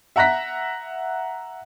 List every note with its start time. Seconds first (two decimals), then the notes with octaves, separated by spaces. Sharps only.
0.16 E5 F#5 A#5 F#6 A#6 B6